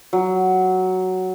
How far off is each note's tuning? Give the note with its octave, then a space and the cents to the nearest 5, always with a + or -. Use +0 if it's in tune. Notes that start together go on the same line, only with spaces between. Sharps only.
F#3 +5